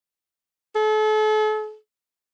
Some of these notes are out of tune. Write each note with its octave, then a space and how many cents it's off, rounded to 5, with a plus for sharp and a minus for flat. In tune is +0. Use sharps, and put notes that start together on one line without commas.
A4 -40